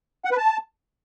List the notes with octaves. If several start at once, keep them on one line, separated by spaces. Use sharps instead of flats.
F#5
B4
A5